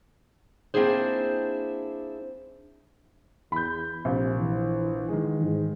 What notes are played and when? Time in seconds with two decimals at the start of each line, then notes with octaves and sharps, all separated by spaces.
0.74 A#3 C4 D4 E4 G#4 C5
3.52 E2 B5 G6
4.05 A#1 C3
4.39 E3
5.08 D#3 G#3
5.43 G#2